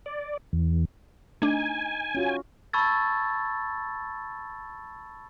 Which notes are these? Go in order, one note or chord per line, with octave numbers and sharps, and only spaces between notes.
D5
E2
A3 D4 D#4 G#5
C#4 F4 F#4
A5 B5 C#6 E6 G#6 A6